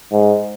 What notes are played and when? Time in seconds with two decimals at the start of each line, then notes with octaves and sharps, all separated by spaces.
0.12 G#2